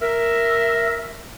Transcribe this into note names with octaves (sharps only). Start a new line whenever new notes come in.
A#4 E5